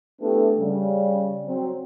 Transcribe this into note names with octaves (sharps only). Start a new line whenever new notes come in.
A3 B3 D4 E4 G4 A4
C#3 G3
F#3 C4